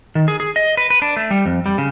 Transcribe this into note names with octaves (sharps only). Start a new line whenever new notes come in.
D#3
G#4
G#4
D#5
B4
B4
D4
A3
G3
F2
G3
C#3